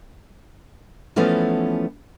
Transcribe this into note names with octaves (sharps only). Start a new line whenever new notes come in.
E3 F3 A3 B3 C#4